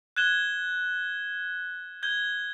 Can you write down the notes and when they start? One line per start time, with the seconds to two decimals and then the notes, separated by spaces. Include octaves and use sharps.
0.16 F#6 G#6 E7 G7
2.03 G6 G#6 G7